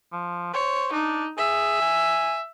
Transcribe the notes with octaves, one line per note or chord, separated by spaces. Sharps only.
F3
C5 C#5
D4 D#4
G#4 E5
G#5